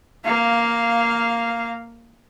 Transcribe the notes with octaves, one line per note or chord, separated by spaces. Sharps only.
A#3 F5